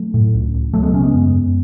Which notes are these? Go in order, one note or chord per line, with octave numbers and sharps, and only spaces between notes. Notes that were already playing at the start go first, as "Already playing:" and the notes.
Already playing: F#3 A3
A2
C#2
C#2
C#2 F#3 A3
G#3 B3
C#3 A3 C#4
G#3 B3
F#2
F#2